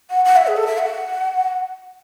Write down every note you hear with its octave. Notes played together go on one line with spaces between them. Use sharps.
F#5
F#5
E5
G#4
A4
E5
F#5